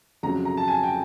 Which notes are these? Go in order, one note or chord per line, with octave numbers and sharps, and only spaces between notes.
F2 C#3 F#3 A#5
A#5
A5
G#5
G5